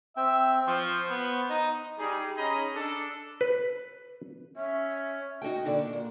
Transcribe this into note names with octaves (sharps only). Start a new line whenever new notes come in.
C4 E5 G5
F3 C5 C#6
B3
D#4 D#5
G3 D#4 G#4
C#4 D#4 G#4 D#5 A#5 B5
D4 A4
B4
C#4 E5
D#4 F#4 G#4 G5
A#2 D3 D5
D4
A#2